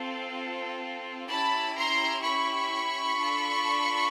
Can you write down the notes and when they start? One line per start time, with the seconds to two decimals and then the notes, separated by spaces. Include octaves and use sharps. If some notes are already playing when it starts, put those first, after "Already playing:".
Already playing: C4 F4 A4
1.30 C#4 E4 G4 A5 B5
1.77 A#5 C6
2.23 B5 C#6
3.15 D4 F4 A4